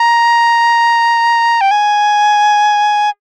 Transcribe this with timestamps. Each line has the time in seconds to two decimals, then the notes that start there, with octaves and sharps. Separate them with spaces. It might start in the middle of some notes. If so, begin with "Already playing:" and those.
Already playing: A#5
1.61 G5
1.71 G#5